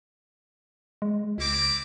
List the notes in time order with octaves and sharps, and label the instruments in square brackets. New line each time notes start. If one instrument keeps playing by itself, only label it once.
[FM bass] G#3
[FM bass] C#2 [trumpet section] C4 E4 D6